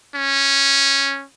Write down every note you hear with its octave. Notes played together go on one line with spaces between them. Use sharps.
C#4